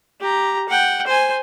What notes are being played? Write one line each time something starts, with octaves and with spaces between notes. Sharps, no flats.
G4 A#5
F#5 G5
C5 G#5